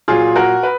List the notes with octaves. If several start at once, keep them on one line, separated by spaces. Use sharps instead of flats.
A#2 F#3 F4 G#4
F#4 A#4
B4